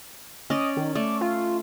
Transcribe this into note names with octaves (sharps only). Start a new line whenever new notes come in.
C#4 D5 D#5
D#3
A3 D5
F4